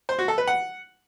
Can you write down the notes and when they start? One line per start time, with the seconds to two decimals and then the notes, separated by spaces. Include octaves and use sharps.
0.09 C5
0.19 F#4
0.28 A4
0.38 B4
0.47 F#5